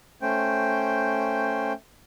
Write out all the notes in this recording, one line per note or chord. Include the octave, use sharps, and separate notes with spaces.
A3 C#4 C5 G5